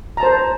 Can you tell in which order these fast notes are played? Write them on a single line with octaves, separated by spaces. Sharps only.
A#5 A5 C5